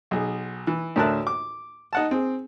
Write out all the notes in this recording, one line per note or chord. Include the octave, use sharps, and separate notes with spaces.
B1 G#4
E3
D2 A2 A#4 E5 A5 F#6
D6
D#4 F#5 A5
C4 G#4